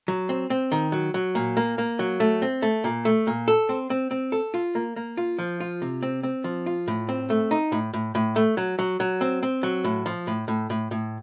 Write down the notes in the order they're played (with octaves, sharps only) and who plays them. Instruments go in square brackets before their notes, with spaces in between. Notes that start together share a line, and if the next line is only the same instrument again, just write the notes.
[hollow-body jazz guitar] F#3
C4
C4
D#3
F#3
F#3
A#2
A#3
A#3
F#3
A3
C4
A3
A#2
A3
A#2
A4
C4
C4
C4
A4
F4
A#3
A#3
F4
F3
F4
C3
C4
C4
F3
F4
A2
C4
A3
D#4
A2
A2
A2
A3
F#3
F#3
F#3
C4
C4
F#3
A2
F3
A2
A2
A2
A2